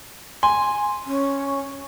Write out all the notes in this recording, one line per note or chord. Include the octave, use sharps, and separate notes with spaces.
G#5 C6
C#4